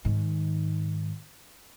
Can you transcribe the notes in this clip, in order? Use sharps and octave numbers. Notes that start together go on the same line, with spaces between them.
G#2 D#3